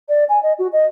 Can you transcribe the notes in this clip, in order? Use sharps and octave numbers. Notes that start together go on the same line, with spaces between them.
D5
G#5
D#5
F#4
D#5